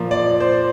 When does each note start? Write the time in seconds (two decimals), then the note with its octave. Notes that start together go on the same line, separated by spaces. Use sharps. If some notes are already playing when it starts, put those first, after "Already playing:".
Already playing: A#2 F3 A#3
0.11 D5
0.40 C5